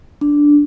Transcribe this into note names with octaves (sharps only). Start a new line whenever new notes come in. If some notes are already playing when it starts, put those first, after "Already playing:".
D4